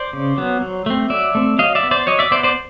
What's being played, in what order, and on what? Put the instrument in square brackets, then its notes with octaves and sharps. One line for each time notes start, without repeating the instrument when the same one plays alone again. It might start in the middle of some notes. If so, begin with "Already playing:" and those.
Already playing: [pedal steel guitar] C5 D5
C#3
F#3 B3
F#3
A3 C4
F#3 D5 E5
A3 C4
F#3 D#5 F5
D5 E5
B3
C5 D5
F#3 C#5 D#5
D5 E5
B3 C5 D5
C5 D5